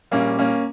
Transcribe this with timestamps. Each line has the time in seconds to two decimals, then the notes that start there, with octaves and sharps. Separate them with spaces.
0.11 A#1 A#2 G3 A#3 C#4
0.39 A#3 C#4